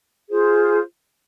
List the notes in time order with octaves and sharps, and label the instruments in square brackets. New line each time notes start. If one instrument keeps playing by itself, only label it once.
[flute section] F4 G#4 C5